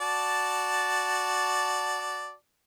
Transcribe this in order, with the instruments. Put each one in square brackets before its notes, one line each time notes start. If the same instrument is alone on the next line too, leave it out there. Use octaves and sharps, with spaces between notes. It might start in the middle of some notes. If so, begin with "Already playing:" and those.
[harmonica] F#4 D5 A5